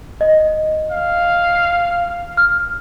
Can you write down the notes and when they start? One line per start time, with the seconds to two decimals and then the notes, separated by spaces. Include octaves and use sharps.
0.21 D#5
0.92 F5
2.37 F6